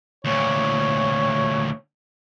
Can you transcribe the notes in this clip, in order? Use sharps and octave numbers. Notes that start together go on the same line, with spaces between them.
D2 A#2 C#5